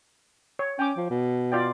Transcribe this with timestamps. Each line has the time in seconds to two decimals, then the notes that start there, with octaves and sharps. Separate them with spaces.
0.59 C#5
0.79 C#4 G5 D6
0.97 F3
1.10 B2
1.52 F4 D5 G5